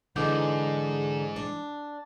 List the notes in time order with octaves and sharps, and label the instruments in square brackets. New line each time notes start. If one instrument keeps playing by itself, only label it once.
[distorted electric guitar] G#2 [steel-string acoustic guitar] D3 D#4 [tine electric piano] E3 D6 G6 [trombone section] G#3
[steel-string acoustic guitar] D4